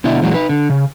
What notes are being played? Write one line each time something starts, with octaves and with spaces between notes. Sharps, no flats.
B2 D3 E4 D5 E5
A#2 E3 F#3 G#3 F#4
D#4 B4
D3
C#3